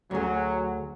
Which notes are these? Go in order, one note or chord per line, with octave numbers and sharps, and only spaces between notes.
D2 F#3 G#4